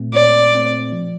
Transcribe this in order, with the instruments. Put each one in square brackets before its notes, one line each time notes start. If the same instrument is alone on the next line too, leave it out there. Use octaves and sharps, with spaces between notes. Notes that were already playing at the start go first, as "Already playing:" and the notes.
Already playing: [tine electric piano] A#2 A3 C4
[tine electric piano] A#2 [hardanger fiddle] D5
[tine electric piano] A3 C4
F3